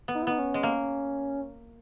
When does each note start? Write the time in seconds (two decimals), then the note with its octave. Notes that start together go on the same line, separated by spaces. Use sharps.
0.08 B3
0.15 D#4
0.22 E4
0.27 B3 D#4
0.39 C#4
0.54 G#3
0.63 A#3